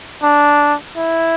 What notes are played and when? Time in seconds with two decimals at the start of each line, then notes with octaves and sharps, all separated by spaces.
0.23 D4
0.97 E4